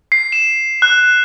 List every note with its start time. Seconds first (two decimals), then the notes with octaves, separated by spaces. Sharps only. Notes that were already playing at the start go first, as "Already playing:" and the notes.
0.12 C7
0.32 E7
0.82 F#6